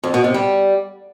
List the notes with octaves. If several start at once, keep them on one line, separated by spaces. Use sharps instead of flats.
F2
B2
C3
G3